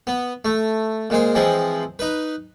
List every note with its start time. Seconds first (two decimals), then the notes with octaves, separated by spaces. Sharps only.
0.07 B3
0.45 A3
1.10 A#2 G#3 C5
1.35 E3 F3 G#3 C4
1.99 D#4 B4